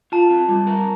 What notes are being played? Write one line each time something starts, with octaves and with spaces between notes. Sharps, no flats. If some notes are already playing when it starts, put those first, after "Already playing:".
F4 A5
C4
G3
A#4